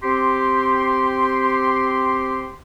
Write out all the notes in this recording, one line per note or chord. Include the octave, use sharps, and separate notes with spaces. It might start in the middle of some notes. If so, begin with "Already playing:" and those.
C4 G4 C6